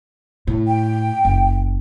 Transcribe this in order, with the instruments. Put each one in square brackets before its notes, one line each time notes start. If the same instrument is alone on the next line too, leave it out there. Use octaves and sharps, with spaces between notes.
[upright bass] A2
[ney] G5
[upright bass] F#1